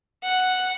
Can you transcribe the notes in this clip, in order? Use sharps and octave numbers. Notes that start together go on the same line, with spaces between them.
F#5